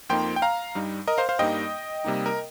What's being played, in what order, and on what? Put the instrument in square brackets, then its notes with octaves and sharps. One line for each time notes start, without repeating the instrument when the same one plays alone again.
[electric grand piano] F2 F3 A#3 D#4 G5 C6
G5
F5 A#5
G2 G3 D#4
A#4 D#5
C5 F5
C5 F5
G2 G3 A#3 D#4 D#5 G5
C3 G3 A#3 D#4
A#4